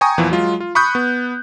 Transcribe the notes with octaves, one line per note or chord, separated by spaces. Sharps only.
G5 G#5 A#5 C#6 D#6
E2 A#2 E3 F3
F#3 G#3 F4
F4
B5 C#6 D#6 F#6 G6
B3